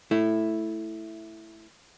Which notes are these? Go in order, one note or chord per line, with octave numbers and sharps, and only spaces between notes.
A3 E4